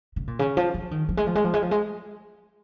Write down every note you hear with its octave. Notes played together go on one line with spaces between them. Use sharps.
C#3
A#2
C#3
F3
F3
D#3
F3
G#3
F3
G#3
F3
G#3
F3
G#3